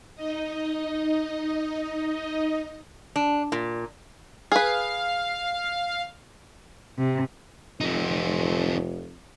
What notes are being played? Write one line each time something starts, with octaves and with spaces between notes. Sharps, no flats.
D#4 D#5
D4
A#2
G#4 B4 F5
C3
F1 F2 C4 D#4